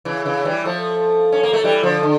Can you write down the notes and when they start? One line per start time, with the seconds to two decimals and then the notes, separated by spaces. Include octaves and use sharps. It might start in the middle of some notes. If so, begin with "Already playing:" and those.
0.05 C#3 E3
0.25 C#3 E3
0.45 E3 G3
0.65 F3 A3
1.32 C#4
1.43 A#3
1.53 A3
1.64 E3 G3
1.83 D3 F3
2.03 D3